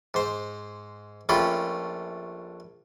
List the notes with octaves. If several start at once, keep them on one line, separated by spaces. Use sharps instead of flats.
G#2 C5
A#1 A3 C#4 F4 G5 B5